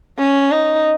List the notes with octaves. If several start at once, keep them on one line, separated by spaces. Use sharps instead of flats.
C#4
D#4